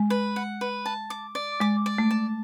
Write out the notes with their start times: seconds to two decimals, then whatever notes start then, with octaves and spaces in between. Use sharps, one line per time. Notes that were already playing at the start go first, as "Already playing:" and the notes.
Already playing: G#3
0.10 B4
0.36 F#5
0.61 B4
0.86 A5
1.10 D6
1.35 D5
1.60 G#3 D6
1.86 D5
1.98 A3
2.11 A5